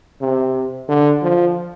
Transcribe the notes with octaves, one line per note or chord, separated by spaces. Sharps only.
C3
D3
F3